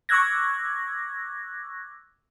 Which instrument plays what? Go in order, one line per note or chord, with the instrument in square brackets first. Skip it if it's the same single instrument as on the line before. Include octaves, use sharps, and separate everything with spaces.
[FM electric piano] C#6 D6 E6 F#6 G#6 A#6